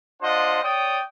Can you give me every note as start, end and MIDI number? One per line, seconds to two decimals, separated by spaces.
0.22 0.61 62
0.22 0.61 65
0.22 0.61 72
0.22 0.61 75
0.22 0.61 78
0.63 1.01 73
0.63 1.01 74
0.63 1.01 79
0.63 1.01 87